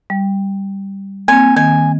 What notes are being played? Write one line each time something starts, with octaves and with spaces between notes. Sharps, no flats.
G3
A#3 C4 G#5
D#3 G#5